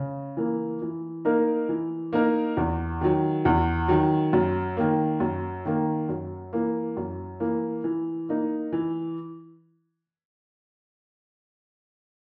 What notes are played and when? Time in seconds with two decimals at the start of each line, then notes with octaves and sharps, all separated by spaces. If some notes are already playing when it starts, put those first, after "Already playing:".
Already playing: C#3
0.37 E3 A#3
0.82 E3
1.25 A#3 D#4 A#4
1.69 E3
2.13 A#3 D#4 A#4
2.57 E2
3.01 D#3 F#3
3.45 E2
3.88 D#3 F#3
4.33 F#2
4.77 D#3 A#3
5.20 F#2
5.65 D#3 A#3
6.09 F#2
6.53 E3 A#3
6.97 F#2
7.40 E3 A#3
7.84 E3
8.29 A#3 D#4
8.72 E3